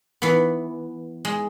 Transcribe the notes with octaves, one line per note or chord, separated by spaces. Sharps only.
E3 B3
G#3